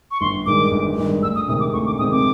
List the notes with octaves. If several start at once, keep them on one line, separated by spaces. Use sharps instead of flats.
C#6
G1 C6
G2 D#3 G#3 D6
G1
G2 D#3 G#3
D2 E6
D#6
C3 D#3 G#3 C4 D#6
D6
D2 C#6
D6
C3 D#3 G#3 C4 D#6
D6